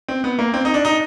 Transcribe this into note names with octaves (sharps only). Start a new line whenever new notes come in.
C4
B3
A#3
C4
D#4
D4
D#4